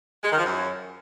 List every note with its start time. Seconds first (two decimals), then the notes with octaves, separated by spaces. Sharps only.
0.23 G#3
0.31 D#3
0.38 F3
0.45 F#2